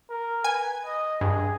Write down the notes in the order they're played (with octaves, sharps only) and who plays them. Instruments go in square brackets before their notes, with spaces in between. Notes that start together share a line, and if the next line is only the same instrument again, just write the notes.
[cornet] A#4
[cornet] B4 [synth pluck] G#5
[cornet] D#5
[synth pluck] G2 [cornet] G#4